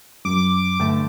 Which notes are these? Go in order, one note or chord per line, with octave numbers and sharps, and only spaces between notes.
F#2 D6
G2 D3 A3 G5 A5